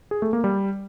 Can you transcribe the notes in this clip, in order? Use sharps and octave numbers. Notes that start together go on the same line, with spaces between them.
G#4
A3
A#3
G3